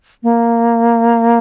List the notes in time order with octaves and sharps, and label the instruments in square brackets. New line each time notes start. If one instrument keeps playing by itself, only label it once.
[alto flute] A#3